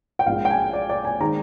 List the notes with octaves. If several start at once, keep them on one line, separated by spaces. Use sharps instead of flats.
G5
A#1 A#2 G#3 F5
G5
G#5
D5
D5
G#5
D#3 G#3 C4 A#5